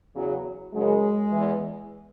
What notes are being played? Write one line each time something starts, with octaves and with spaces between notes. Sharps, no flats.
E2 C#3 F#3
F#2 C#3 F#3 G#3
E2 E3